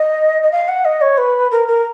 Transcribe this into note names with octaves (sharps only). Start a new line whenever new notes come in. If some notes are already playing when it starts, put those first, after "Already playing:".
Already playing: D#5
D#5
F5
F#5
D#5
C#5
B4
A#4
A#4